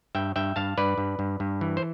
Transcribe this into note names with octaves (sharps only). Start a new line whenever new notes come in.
G2 E5 G5
G2 E5 G5
G2 F5 A5
G2 B4 D5
G2
G2
G2
E3
C5